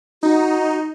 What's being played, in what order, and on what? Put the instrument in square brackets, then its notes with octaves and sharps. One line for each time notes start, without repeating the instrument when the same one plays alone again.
[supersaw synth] D#4 [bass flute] F#4